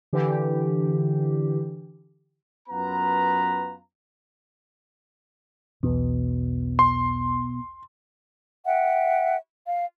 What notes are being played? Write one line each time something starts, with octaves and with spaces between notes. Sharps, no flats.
D3 E3 G4
F#2 B3 F4 B4 A#5
B1 E2 B2
C6
E5 F#5 G5
F5